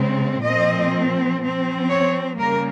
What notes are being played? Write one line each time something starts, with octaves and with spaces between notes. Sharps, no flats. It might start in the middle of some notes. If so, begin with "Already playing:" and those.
Already playing: C#3 G#3 C4
A#2 F3 C4 D#5
F3 C4
C#5
C#3 G3 A#3 A#4